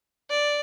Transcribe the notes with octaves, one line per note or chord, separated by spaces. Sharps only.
D5